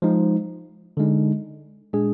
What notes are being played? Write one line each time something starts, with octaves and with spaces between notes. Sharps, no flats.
F3 G#3 D#4
D3 G#3 D#4
A#2 G#3 D4 G#4